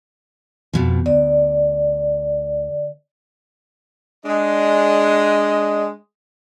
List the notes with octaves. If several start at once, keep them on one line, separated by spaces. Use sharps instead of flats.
F2 B2 F3
D2 D5
G#3 D4 D#5